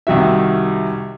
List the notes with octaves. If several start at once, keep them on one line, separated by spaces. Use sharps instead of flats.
C2 D#3 F#4 E5